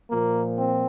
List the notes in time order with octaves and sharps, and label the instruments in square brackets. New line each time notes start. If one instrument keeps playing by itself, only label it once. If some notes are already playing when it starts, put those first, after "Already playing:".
[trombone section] A#2 F3 A#3
C4